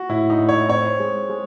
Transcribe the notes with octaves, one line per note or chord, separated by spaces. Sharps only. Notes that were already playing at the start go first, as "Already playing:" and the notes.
Already playing: F#4
A2 E4
D#4
A2
C#5
C4 C#5
G#3
G#3